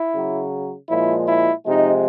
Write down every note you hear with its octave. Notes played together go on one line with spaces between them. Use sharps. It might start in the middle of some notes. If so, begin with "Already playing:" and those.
Already playing: E4
C#3 F#3
A#2 F3 G#3 E4
E4
C3 F3 G#3 D#4